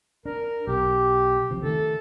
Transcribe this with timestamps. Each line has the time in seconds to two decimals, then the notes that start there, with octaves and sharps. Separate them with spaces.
0.26 D4 A#4
0.67 B1 G4
1.51 C#3 F3 C4
1.63 D#3 A3 A4